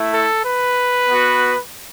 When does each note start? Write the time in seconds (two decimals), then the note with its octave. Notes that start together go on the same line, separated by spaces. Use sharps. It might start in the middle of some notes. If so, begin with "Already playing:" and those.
Already playing: A3 E4
0.13 A4
0.45 B4
1.09 B3 F#4